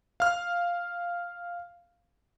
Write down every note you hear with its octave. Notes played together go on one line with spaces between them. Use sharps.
F5 F6